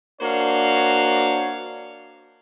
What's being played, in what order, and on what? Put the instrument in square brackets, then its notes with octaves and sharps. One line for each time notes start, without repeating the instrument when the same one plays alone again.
[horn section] A#3 D4 F#4 C5 C#5 F5